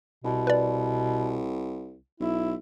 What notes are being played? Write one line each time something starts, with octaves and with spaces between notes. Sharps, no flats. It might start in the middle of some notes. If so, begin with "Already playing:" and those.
C2 B2
B4 D5
B1 E4